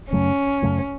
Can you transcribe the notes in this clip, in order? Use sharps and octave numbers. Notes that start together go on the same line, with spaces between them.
F#2 C#3 F#3 A3 C#4
F#2 C#3 F#3 A3